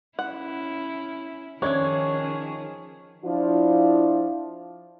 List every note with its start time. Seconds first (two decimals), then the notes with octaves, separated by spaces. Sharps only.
0.19 C#4 E4 F#5
1.62 D#3 F3 C#4 D4 G#4 C#5 E5 G#6
3.24 F3 D4 E4 F4